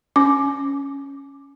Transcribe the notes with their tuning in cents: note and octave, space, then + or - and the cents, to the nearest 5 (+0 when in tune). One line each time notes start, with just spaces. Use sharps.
C#4 +0 D6 +10